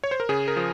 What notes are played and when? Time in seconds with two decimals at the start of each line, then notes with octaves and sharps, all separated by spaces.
0.04 C#5
0.11 C5
0.20 A#4
0.29 C#3 G#4
0.48 A#4
0.56 F3